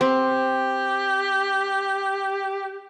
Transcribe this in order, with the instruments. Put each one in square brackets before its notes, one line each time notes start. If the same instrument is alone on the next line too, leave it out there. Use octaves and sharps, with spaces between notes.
[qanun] C4 [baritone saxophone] G4